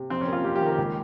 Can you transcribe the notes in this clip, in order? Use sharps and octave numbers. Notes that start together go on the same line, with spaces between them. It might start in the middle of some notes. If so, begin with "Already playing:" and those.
Already playing: C3
F2 C4
C#4
A#3
F4
F2 G4
G4
D#3
A#4
C#2